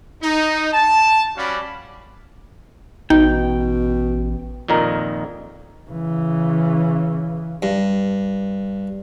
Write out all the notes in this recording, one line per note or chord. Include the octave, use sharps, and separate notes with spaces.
D#4
A5
G3 C#4 F#4 D5 F5 B5
A1 B2 D#4 G5
F2 A#2 D#3 D#4 A#4
C#3 E3
G2